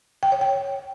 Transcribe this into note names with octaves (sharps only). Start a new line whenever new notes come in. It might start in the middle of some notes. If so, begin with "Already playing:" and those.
G5
C#5
G5